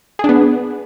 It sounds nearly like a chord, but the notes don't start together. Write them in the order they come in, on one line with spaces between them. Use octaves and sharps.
G#4 D4 B3